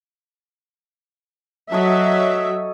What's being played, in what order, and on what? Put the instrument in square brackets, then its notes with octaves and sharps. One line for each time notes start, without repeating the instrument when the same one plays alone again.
[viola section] F#3 E5 [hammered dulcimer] A4 C#5 D#5